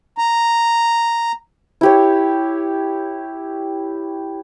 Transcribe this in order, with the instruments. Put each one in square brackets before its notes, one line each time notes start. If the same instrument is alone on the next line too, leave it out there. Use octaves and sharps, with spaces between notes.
[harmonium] A#5
[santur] E4 G4 C#5